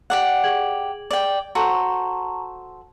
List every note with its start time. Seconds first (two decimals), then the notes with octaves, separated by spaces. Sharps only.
0.10 G4 D5 F#5
0.44 G#4 G#6 F#7
1.11 D5 G5
1.55 F#4 A4 C5 A5 A#5 C#6